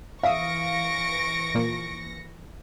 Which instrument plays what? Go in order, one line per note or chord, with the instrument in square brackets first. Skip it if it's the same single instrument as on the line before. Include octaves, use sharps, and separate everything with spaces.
[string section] E3 A#6 C#7 [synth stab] E5 D#6 [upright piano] F5 [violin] C#6 D7
[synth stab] A#2 F3 A#3